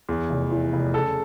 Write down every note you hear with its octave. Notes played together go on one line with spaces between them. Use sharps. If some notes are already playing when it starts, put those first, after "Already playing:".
E2
F1
E3
F1
C#3 A4